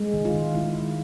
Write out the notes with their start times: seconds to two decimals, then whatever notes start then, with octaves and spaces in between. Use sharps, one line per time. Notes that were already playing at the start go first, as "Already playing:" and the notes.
Already playing: G#3
0.14 D#3
0.25 F4
0.35 D#3
0.55 G#3 E4
0.76 D#3